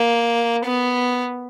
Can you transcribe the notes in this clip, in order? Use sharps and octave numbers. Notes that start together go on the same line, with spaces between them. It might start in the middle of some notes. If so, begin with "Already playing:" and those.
Already playing: A#3
B3